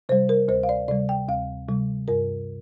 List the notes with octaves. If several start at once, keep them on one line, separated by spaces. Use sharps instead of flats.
C3 G3 C5
A#4
D2 C5
F5
D5
C3 G3 D5
G5
D2 F5
C3 G3
G2 A#4